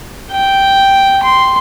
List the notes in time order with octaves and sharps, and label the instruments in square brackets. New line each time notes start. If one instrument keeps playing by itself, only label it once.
[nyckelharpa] G5
C6